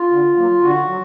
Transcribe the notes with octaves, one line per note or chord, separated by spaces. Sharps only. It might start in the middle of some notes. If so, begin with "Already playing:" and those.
Already playing: F4
D3
F#3 A#3
D3 F#4
F#3